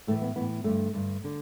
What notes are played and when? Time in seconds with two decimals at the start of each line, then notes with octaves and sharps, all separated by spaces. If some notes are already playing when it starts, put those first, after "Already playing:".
0.07 A2 A3
0.11 E3
0.22 B3
0.36 A2 E3 B3
0.64 G2 D3 A3
0.93 G2 D3
1.24 D3